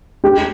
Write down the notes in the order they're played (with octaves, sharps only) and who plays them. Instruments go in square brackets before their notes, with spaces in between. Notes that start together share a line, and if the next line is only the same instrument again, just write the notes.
[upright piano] G4